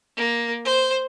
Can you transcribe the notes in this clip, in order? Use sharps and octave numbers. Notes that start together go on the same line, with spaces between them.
A#3
C5